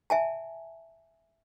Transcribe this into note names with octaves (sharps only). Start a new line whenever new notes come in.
E5 G#5 A5